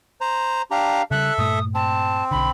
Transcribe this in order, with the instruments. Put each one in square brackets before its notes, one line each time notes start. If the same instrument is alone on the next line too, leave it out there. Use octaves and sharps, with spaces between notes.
[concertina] C5 A#5
[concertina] D4 G4 A#5 [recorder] F5
[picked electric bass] C#3 G3 [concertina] A4 E5 [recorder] F#6
[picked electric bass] G2 A#2 A3 [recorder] D#6
[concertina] C4 [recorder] A5
[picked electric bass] B1 D3 [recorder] B5